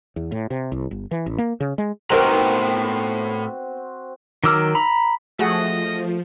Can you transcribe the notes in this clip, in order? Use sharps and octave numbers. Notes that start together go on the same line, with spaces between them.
E2
A2
C3
C2
G1
E3
A1
A#3
C#3
G#3
A2 B3 C4 D#4 F#4 A#4 G5 A#5
D#3 F#3 D6 E6 F6
A#5 B5
F3 A3 F#4 G#4 D#5 F#5